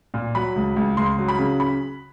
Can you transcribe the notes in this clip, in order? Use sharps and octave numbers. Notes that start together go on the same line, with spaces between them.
A#2
F#3 B5
C#2
C#2
C#2 C6
F#3
B5
C#3
B5